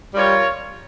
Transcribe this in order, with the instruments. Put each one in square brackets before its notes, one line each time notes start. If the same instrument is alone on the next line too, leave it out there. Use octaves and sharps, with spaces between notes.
[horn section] G3 [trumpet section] F4 A#4 C#5